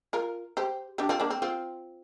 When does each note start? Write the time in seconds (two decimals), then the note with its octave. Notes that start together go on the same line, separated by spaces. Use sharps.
0.13 F4 A#4
0.57 G4 C5
0.98 D4 G4
1.09 C4 F4
1.20 A#3 D4
1.30 C4
1.42 C4 F4